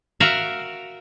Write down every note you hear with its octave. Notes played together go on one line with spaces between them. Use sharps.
F#4 A#4 E5 F5